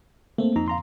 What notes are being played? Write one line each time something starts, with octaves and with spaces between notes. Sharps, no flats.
A3 A#3 C4
F2 D#4 A#5
F5 A#5 C6